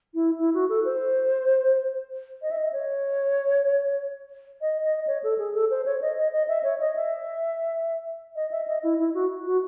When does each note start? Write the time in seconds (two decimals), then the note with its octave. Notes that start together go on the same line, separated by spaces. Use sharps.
0.14 E4
0.39 E4
0.54 F#4
0.69 A4
0.85 C5
2.42 D#5
2.51 E5
2.58 D#5
2.72 C#5
4.61 D#5
4.84 D#5
5.07 C#5
5.23 A4
5.38 G#4
5.54 A4
5.70 C5
5.86 C#5
6.01 D#5
6.17 D#5
6.32 D#5
6.48 E5
6.63 C#5
6.80 D#5
6.96 E5
8.36 D#5
8.51 E5
8.67 D#5
8.83 E4
8.99 E4
9.14 F#4
9.46 F#4